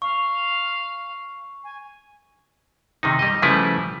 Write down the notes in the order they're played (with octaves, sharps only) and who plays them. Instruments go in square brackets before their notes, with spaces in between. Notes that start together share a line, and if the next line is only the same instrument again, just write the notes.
[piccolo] F5 [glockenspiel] C#6
[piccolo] G#5
[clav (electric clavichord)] C3 D#3 D#4
G3 D#5
C#3 F3 G3 A3 E4 B4